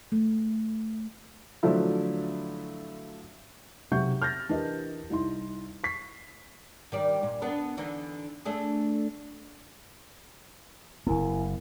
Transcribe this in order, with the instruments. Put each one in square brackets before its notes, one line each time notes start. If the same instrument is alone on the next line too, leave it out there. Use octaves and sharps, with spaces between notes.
[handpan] A3
[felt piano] D3 F3 F#3 A3 E4
B1 C3 E5 F#5 C#6 G6
F6 G6 A6 A#6
E3 D4 G4 A#4 B4 D#5
C2 D#4 E4 C6
C#6 B6 C7
[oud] D#3 G3 D5
A#2
B3 D4 A#4
D3 E3 D#4
A3 D4 G#4
[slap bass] F#1 B3 [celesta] E4 A#4 G#5